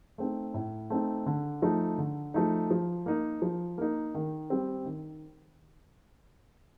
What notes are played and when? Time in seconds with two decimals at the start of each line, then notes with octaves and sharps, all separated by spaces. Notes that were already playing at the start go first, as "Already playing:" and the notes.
0.18 A3 C4 D#4
0.54 A2
0.90 A3 C4 D#4
1.26 D3
1.62 F3 A3 D#4
1.98 D3
2.34 F3 A3 D#4
2.70 F3
3.06 A#3 D#4
3.42 F3
3.78 A#3 D#4
4.14 D#3
4.50 G3 C4
4.85 D#3